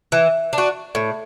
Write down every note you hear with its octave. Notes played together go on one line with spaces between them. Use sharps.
E3
D4
F#4
A2